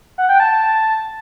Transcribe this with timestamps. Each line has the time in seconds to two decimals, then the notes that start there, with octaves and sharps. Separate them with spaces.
0.18 F#5
0.29 G5
0.40 A5